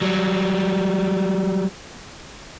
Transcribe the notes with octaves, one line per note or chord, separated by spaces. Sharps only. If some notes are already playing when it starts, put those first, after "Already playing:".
F#3 G3